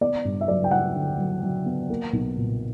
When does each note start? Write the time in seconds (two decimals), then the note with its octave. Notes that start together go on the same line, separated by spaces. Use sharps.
0.01 B3 D5
0.25 G2
0.41 E5
0.48 F#3 D5
0.64 G5
0.71 F#3 F#5
0.96 D3
1.18 F#3
1.43 F#3
1.66 B3
1.90 A#3
2.13 B1
2.37 A#2